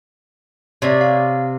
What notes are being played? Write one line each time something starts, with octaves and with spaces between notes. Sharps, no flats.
C3 C#5 D5
F5